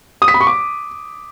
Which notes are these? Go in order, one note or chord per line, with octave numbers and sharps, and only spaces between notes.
D#6
B6
B5
C#6
D6